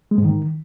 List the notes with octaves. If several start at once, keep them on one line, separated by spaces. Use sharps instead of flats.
G#3
G#2
D#3